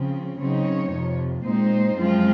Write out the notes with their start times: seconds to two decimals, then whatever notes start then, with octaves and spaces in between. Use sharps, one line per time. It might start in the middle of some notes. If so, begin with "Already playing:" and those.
Already playing: C#3 F3 C4
0.38 C#3 F#3 C4 D#4 C#5
0.92 F2 C3 F3
1.44 A#2 G#3 C4 D#4 C5
1.97 F#2 F3 G#3 C4 F4